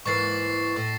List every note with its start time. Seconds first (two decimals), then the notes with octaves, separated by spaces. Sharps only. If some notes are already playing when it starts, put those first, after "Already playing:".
0.06 G#2 E3 A#3 C#6 A6 C7
0.76 A2 C#6